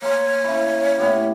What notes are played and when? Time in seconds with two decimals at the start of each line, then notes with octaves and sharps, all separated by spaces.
0.02 A#3 C#5 C6
0.44 C#3 E4
0.98 A2 B3 G4